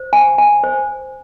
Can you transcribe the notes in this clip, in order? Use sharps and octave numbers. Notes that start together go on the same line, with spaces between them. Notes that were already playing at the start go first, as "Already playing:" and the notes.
Already playing: C5
G#5
G#5
C5